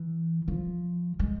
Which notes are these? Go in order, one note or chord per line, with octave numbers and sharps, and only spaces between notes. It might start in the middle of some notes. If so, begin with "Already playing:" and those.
Already playing: E3
F3
G#3